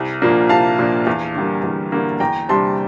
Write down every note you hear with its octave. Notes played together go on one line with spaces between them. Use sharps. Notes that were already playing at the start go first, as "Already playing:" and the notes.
Already playing: C2 E5
A#2 F3 A#3 D4
C2 F5 A5
A#2 F3 A#3 D4
E2
D3 G3 A#3
E2
D3 G3 A#3
E2 G5 A#5
C3 G3 D4 A5 C6